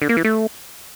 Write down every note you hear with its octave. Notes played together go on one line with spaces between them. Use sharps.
D3
A#3
E3
A3